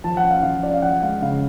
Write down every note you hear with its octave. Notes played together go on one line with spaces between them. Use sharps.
F3 A5
F#5
C#4
F5
F3 F5
C#4 D5
F5
F3 F#5
G#3 F5
C#3 F5